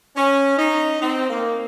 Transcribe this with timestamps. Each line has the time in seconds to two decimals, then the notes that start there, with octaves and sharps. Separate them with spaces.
0.16 C#4
0.58 D#4
1.01 C4
1.29 A#3